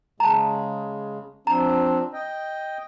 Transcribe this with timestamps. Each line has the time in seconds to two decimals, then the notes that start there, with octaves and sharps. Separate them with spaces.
0.20 C#3 G#3 A5 A#5
1.47 F3 C4 D4 A#5
2.13 D#5 G5